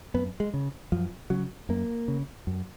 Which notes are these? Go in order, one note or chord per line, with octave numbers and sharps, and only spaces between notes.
F#2 B3
G#3
C#3
F#2 F3
C#3 F#3
F#2 A#3
C#3
F#2